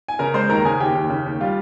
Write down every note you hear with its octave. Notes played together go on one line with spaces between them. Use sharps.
G#5
C#3 A#4 A#5
G#3 C5 C6
D#2 A#4 A#5
C#3 G#4 G#5
D#2 G4 G5
D#2
C#3
D#2
G3 F4 F5